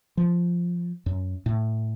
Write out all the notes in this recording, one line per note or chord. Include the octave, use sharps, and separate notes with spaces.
F3
F#2
A2